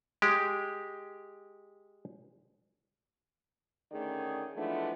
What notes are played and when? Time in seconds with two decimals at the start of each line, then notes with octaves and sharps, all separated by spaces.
0.22 G#3 G4
3.92 D3 D#3 A3 C#4 G#4 D5
4.56 E3 F3 G#3 A3 B3 D4